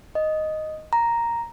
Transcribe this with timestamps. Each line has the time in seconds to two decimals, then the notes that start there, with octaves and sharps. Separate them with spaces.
0.15 D#5
0.93 A#5